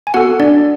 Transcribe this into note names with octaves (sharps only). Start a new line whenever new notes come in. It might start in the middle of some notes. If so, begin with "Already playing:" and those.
G#5
B3 F#4 A4 F#5
D4 D5